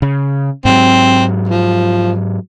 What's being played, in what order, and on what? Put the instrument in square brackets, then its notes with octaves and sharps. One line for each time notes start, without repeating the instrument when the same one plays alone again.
[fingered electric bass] C#3
[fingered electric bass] G#2 F#3 [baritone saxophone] C4
[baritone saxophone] F3